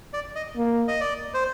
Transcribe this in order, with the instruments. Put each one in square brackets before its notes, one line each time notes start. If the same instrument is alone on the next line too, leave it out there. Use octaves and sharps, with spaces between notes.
[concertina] D5
D#5
[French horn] A#3
[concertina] D#5
D5
C5